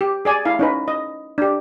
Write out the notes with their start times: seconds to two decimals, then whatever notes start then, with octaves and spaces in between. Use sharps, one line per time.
0.01 G4
0.25 G#4 D5 G#5
0.45 E4 F5
0.59 C#4 D#4 B4
0.88 D#5
1.38 D4 G4